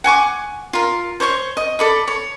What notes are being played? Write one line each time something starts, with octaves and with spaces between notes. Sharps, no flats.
F#5 G#5 C#6 D6
F4 A#4
C5 C#5 D#5 C#6
D#5
A4 D5 B5
C#5